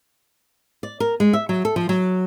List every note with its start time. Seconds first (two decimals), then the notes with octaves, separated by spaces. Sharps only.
0.83 D5
1.00 A#4
1.20 G#3
1.33 E5
1.49 F#3
1.65 A4
1.76 F3
1.89 F#3